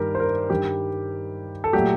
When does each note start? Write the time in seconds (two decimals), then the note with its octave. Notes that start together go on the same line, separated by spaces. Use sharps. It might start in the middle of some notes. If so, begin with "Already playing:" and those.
Already playing: G2 D#3 A#3 G4 A#4
0.15 C5
0.20 A#4
0.50 G2 D#3 G3 G4
1.64 A4
1.73 A#2 F#3 A3 G4